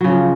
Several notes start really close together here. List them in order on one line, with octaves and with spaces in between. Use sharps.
F#3 C#3 F3